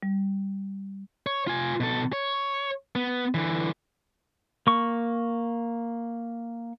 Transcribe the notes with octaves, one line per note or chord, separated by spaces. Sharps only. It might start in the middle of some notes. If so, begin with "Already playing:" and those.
G3
C#5
F4 G#5
B2 A4
C#5
B3
D3 E3
A#3 C#6